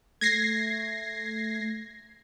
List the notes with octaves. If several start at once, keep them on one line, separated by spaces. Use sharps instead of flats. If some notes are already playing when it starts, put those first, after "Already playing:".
A3 G#6 A#6 C7